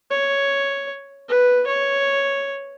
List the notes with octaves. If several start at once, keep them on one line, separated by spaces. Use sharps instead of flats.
C#5
B4
C#5